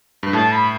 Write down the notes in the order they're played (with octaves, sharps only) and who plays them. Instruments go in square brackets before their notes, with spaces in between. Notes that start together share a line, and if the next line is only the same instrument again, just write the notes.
[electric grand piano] G2
[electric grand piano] A2 [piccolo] A5
[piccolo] B5